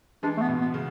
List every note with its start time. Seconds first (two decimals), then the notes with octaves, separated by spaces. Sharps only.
0.23 E3 G#3 D4
0.37 A3
0.42 B3
0.49 B2
0.61 B3
0.74 C#3